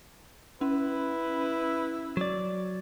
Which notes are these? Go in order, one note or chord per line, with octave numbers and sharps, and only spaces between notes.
C#4 E4 B4
F#3 D5